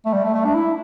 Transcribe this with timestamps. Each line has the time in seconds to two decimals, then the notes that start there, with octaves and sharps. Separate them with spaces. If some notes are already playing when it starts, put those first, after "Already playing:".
0.06 A3
0.13 G3
0.24 A3
0.34 A3
0.45 D4
0.55 E4